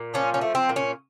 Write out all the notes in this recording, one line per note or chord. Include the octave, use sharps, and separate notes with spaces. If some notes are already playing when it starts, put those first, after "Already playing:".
Already playing: A#2
F3 C#4
C#4
A3
C4
A#2
C#4